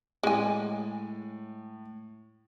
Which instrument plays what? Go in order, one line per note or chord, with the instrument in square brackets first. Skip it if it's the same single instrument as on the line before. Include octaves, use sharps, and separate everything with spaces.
[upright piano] A2 [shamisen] G#3 G#5